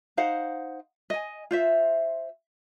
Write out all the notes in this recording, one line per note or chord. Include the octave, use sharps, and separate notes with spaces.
D#4 C5 F5 F#5
D#5 G#5
F4 C5 E5